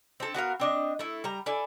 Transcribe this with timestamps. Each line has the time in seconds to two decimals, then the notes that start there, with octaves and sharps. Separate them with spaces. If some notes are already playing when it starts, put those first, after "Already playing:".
0.20 C4 A4
0.34 B3 F#4 A#4 F5
0.60 C4 D4 D#5
0.99 A3 E4
1.24 G3 A#5
1.46 E4 A4 D5 G#5